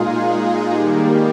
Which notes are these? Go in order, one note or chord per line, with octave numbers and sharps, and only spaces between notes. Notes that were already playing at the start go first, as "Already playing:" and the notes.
Already playing: A#2 G#3 D#4 F4 G#4
D#3 G3 A#3 G4